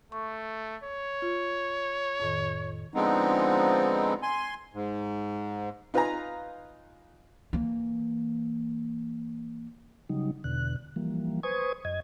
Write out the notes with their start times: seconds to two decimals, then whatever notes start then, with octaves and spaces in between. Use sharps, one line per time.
0.12 A3 C#6
0.84 C#5
1.22 F4
2.20 F2 A2 D#3
2.94 D3 F3 G#3 B3 C4 D#4
4.23 G#5 C6
4.74 G#2
5.94 D#4 F4 B4 F5 G#5 A#5
7.53 E3 A#3
10.09 C#3 F#3 G3 D#4
10.44 E2 B2 D3 F#6
10.96 E3 F3 G3 A#3
11.43 B4 C5 G#5 C#6 D#6 G#6
11.85 F#2 D#5 G#6